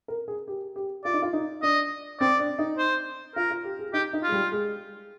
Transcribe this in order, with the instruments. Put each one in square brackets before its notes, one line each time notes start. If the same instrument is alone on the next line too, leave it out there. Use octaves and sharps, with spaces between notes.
[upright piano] A#4
G#4
G4
G4
[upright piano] F4 [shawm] D5
[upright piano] D#4
F4
D#4
[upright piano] D4 [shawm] D#5
[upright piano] C4 [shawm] D5
[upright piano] D4
D#4
[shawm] C5
[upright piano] F4 [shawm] A#4
[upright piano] F4
G4
G#4
[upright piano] D#4 [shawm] G4
[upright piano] D#4
[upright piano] G#3 [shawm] F4
[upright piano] G3
G#3